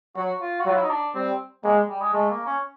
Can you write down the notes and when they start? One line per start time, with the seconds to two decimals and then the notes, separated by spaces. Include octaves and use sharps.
0.16 F#3 F#4
0.41 F4
0.60 F#4
0.66 F#3 F4
0.75 E4
0.83 D#4
0.90 D4
1.15 G3 C4
1.64 G#3 A#3
1.89 G3
2.01 G#3
2.13 G#3 A3
2.30 A#3
2.46 C#4